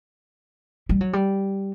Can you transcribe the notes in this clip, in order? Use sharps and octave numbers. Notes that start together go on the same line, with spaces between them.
G3
F#3
G3